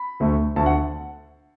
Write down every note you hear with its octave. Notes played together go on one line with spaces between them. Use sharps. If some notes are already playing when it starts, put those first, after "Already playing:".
Already playing: B5
D2 D3 A3
D2 D3 A3 A5
F#5